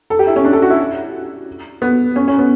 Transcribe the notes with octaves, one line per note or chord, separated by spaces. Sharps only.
A4
G4
E4
C#4
D4
A4
F#4
E4
B3
C#4
C#4
B3